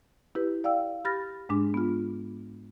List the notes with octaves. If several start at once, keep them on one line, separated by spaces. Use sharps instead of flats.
E4 G4 B4
D5 F5 G5 E6
G4 B5 F6 A6 A#6
G#2 G#3 D4 D6
B3 F4